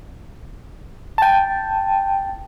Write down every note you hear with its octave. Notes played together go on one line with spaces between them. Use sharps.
G5 A5